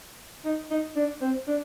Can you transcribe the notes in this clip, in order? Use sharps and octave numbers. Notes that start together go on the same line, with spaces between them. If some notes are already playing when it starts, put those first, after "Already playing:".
D#4
D#4
D4
C4
D4